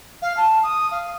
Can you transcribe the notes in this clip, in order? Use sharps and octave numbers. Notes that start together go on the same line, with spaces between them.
F5
A5
D#6
F5